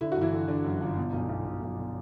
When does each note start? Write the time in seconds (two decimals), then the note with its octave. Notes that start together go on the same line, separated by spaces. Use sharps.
0.01 D3 E4
0.12 F#4
0.17 G1 E3 E4
0.32 D3
0.48 D3 D4
0.64 F#2
0.81 G1
0.97 B2
1.13 B1
1.29 B1
1.45 B2
1.62 B1
1.78 B2